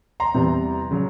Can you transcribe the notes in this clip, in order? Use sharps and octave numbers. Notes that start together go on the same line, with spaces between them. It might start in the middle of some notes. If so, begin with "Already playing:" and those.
A#5 C6
E2 C3 E3 G3
C#3 F#3